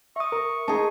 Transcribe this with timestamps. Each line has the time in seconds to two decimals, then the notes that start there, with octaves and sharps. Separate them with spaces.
0.16 E5 C#6 D#6
0.32 A#4
0.68 D#4 G#4 A5